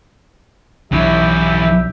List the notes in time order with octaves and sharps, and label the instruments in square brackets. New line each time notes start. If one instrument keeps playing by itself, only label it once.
[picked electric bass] B1 D4 [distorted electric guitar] E3 C#5 [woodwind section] E4 G4 E5